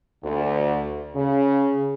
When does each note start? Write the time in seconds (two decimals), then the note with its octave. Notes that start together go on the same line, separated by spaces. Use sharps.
0.24 D2
1.16 C#3